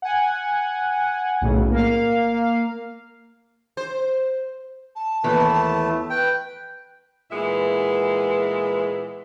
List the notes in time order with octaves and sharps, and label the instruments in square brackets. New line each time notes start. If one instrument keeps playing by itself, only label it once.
[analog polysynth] F#5 G#5
B1 A2 C#3
A#3 F5
[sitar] C5
[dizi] A5
[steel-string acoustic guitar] D#2 E3 B3 [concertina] A3
[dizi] B4 [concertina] G5
[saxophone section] A#2 E3 G#3 B3 E5